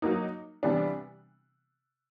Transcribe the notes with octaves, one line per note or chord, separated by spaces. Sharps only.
F#3 A#3 D#4
C3 E3 G3 B3 D4